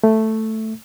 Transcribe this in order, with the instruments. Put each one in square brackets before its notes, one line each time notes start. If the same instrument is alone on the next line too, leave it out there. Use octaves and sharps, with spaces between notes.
[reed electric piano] A3